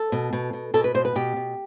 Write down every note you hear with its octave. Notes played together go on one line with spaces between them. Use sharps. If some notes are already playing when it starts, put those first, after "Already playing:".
Already playing: A4
B2
B2
B2
B2 A4
B4
B2 C5
B4
B2 G4
B2